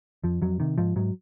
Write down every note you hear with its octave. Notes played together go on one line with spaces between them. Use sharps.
F2 F3
F2 F#3
C3 D#3
G#2 F3
G#2 F#3